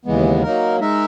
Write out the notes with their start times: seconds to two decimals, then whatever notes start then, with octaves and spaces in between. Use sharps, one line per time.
0.05 D#2 C#3 E3 G#3 B3
0.43 F#3 A#3 D#4 A#4
0.80 G#3 D#4 A#4 E5